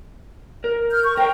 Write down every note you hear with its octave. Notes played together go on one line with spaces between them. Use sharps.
A#4
F6 G6
C#6
A#4 C5 G5